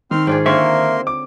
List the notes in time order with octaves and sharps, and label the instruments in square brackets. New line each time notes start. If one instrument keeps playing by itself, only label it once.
[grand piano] D#3 [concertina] C4 C6 F6
[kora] G#2 F4 G#4 [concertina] D4 G5
[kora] D3 C4 C#5 [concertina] A#3 A#4 C6 [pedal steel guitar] E5 C#6
[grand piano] D6